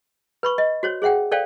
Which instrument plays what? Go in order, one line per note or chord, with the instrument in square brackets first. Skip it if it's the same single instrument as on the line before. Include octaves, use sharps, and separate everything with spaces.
[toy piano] B4 B5 C#6
D#5
F#4 C5 C#5
G#4 C5 E5 F#5 G5
A4 C5 D5 F5 G5